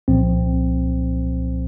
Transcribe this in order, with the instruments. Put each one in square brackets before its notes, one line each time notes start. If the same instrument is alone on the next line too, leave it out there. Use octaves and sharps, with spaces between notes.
[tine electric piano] C2 A#2 F3 C4